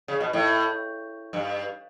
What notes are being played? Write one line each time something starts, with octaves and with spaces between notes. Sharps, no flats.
C#3
B2
A2
G2